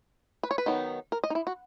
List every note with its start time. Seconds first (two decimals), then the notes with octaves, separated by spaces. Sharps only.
0.43 B4
0.51 C#5
0.58 B4
0.66 D#3 F#3 B3 D#4
1.12 A#4
1.24 D#5
1.30 D#4
1.35 E4
1.47 F#4